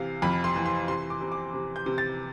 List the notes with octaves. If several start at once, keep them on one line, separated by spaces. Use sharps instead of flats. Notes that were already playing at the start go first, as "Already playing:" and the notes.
Already playing: C3 E3 F5
F2 B5
C6
E3
C6
C3 C6
D6
C3
D6
C3
G6
C3
A6